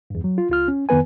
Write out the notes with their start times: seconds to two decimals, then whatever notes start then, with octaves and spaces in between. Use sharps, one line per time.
0.10 E2 G2
0.24 F#3
0.38 F4
0.50 C#2 F4 F6
0.68 C#4
0.89 F2 D#3 B3 B4 G#5